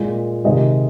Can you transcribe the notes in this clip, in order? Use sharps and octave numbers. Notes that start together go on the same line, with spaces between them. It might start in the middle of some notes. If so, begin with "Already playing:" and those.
Already playing: A#2 G#3
C3 D#3 G#3 D#5